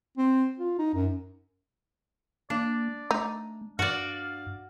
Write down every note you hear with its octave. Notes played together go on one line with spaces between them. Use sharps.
C4
F4
D#4
F#2
A#3 D4 D5
A3 D#4
G2 F#4 D5 F5